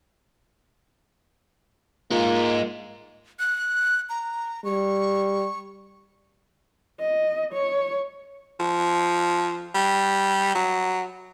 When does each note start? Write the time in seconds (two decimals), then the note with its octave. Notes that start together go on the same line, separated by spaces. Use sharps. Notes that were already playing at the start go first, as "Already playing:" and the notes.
2.11 G#3 A#3 D#4 F4
3.39 F#6
4.10 A#5
4.64 G3 C#6
7.01 D#5
7.53 C#5
8.60 F3
9.75 G3
10.55 F#3